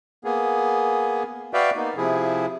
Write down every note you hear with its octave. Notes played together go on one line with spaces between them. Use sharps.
A#3 B3 G#4
F#4 B4 D5 E5 F5 G5
A#3 B3 D#4
C3 F3 E4 G#4